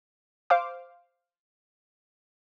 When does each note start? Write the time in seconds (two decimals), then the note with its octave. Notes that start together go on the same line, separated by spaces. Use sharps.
0.50 C5 F5 D6